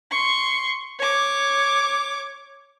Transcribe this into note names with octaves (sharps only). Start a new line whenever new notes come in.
C6 C#6
C#5 D6